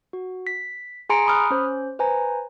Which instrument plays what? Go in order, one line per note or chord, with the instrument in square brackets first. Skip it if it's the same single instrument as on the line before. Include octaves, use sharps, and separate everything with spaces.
[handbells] F#4
B6
G#4 G#5 A#5 C6 C#7 D7
B5 D#6 F6 F#6
C#4 C5
B4 C5 G#5 A#5